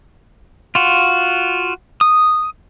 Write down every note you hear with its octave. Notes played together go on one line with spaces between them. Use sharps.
F4 F#4
D#6